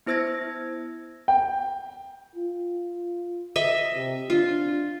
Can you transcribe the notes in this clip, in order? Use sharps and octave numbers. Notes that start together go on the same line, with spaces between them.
B3 E4 C5 E6 G#6 A#6
G5
F4
D#5 E5
C3
D4 F4